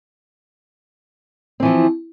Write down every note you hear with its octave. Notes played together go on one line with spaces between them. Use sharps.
E3 F3 C4